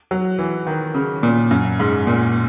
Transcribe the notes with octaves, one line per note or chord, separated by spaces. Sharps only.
F#3
E3
D#3
C#3
A#2
F#2
G#2
A#2